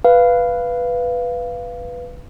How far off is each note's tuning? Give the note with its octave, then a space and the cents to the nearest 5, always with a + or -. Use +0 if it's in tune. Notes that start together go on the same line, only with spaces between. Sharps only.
B4 +0 F5 -10